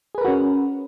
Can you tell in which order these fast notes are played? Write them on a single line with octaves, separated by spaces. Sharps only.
G#4 B4 A#4 F#4 C#4